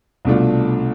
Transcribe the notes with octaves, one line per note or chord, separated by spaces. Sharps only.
C2 B2 A3 D4 F4